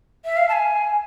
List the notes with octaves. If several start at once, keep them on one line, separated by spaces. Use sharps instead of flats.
E5
F5
A5
G#5